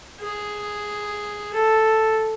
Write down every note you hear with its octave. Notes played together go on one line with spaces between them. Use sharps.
G#4
A4